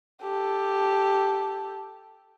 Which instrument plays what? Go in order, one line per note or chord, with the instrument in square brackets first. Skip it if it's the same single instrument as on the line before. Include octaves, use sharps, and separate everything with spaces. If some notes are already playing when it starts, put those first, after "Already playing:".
[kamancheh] G4 A4